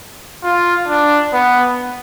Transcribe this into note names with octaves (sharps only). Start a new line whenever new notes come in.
F4
D4
B3